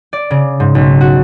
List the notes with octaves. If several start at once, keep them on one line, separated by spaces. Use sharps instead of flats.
D5
C#3
G#2
B1
F#4